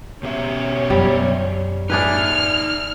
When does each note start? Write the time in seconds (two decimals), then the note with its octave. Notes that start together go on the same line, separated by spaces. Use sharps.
0.23 B2 C#4 G4 E5
0.90 F#2 G3
1.90 D4 D#4 G#4 B4 D5 E5 F6